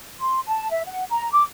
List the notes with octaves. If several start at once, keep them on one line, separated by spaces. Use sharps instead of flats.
C6
A5
E5
F#5
A#5
D6